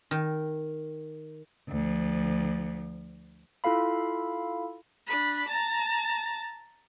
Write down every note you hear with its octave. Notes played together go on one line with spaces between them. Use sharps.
D#3
D2 F3
E4 F4 A4 F5 B5
D4 B5
A5 A#5